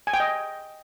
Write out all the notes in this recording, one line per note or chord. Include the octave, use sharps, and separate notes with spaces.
G#5
G5
D#5